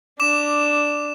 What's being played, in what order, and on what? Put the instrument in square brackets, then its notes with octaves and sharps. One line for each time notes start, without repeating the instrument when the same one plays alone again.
[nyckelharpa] D4 [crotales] D6 E7